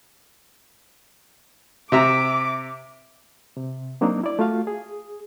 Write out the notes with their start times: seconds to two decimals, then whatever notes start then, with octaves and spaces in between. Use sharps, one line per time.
1.92 C3 E5 A#5 D6
3.57 C3
4.01 F#3 A#3 C4 D4 D#4
4.24 E4 D5
4.39 A3 F4 F#4 F5
4.67 G#4